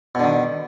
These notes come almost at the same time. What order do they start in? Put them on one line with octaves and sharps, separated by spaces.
B2 D3 D#3